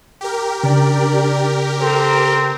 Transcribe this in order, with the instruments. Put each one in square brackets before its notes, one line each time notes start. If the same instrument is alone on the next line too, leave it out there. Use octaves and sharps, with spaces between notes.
[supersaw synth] G4 A#4
[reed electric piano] C#3 [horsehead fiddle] D4 D5
[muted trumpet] C4 [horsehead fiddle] A4 A#5